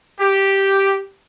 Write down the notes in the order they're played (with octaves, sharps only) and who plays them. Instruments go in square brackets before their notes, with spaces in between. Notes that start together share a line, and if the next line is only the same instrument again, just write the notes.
[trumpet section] G4